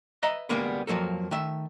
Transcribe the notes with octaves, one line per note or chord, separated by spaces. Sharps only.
B4 D#5 E5 A#5
D2 C#3 G3 G#3 A#3 B3
F2 F3 F#3 A#3 A4
D#3 A3 E5